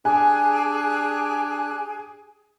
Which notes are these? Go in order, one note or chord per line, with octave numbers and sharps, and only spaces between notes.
D4 G4 G#4 G#5 F#6